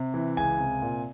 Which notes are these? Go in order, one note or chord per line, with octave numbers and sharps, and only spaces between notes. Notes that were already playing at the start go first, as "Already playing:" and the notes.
Already playing: C3
E3
C#2 G#5
C3
A#2